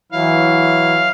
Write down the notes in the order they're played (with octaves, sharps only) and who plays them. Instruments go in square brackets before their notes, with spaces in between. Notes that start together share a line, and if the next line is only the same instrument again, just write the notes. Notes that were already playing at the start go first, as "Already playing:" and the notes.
[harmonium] E3 F#3 E4 [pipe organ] F5